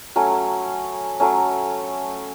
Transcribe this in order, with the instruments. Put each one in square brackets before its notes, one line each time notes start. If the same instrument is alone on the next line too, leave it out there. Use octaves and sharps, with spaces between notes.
[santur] F#3 A3 C#4
F#3 A3 C#4